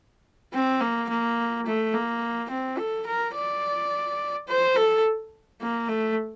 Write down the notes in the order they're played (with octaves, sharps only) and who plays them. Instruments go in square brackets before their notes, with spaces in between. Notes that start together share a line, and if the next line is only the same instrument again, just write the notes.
[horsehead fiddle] C4
A#3
A#3
A3
A#3
C4
A4
A#4
D5
C5
A4
A#3
A3